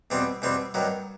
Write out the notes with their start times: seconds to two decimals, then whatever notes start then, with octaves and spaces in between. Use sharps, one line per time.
0.10 E2 B2 G3 C4
0.42 E2 B2 G3 C4
0.74 G2 D#3 F#3